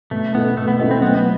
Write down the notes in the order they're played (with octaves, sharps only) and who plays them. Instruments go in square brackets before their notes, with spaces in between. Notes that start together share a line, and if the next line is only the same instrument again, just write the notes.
[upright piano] B2 [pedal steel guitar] A3
[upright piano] A3 E4 A4 D#5 [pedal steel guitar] B3
[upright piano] B2 [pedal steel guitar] A3
[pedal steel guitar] B3
[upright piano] A3 E4 A4 D#5 [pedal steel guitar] B3
[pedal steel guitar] C4
[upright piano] F#3 [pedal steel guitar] B3
[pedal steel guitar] B3